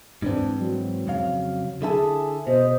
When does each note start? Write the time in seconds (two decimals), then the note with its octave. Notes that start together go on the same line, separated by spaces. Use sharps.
0.22 G#2 E3 C4 D4
0.59 F#3
1.07 F2 C#3 F5
1.82 D3 E4 G#4 A4
2.47 B2 C5 D#5